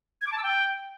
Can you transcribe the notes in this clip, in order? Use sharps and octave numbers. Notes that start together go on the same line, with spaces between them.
G#6
D6
A5
E6
G5